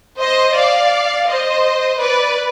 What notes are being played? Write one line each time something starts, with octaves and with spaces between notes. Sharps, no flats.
C5 D#5
D5 F5
C5 D#5
B4 D5